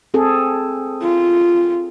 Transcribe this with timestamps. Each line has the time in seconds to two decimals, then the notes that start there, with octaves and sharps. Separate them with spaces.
0.14 C4 G#4 A4
1.01 F4